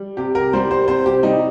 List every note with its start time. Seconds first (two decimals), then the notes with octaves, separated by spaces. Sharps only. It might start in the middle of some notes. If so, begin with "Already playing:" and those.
Already playing: G3
0.17 C3 G4
0.35 A#4
0.53 G3 C5
0.71 C5
0.88 C3 C5
1.06 G4
1.23 G3 D#4